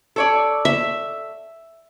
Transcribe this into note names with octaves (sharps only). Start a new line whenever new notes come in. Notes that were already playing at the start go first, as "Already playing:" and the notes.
A4 C#5 D5
E5